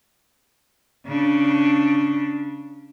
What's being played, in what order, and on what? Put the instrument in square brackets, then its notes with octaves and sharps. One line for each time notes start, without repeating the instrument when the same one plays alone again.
[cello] C#3 D4